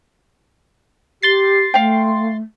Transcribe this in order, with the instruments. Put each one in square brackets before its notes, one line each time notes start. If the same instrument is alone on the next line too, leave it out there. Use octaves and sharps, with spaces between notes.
[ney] G4 [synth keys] C6 A6 C7
[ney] A3 [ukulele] F5 G5